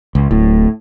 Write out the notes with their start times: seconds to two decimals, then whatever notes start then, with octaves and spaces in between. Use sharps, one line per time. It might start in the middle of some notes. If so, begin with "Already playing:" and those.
0.15 C#2
0.31 D1 A2